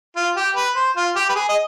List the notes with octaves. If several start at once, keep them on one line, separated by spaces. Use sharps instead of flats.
F4
G4
B4
C5
F4
G4
B4
G#4
D#5